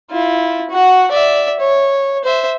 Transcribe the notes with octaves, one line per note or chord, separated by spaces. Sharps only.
E4 F4
F#4 F#5
D5 E5
C#5
C5 E5